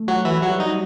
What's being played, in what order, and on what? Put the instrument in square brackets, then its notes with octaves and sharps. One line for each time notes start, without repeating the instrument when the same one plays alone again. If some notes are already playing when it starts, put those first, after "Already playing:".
Already playing: [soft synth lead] A3
[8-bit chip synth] F#3 F#4
E3 E4
[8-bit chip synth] F#3 F#4 [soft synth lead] G3
[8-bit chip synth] D#4
[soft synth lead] G3